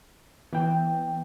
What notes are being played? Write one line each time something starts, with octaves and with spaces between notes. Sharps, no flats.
E3 B3 G5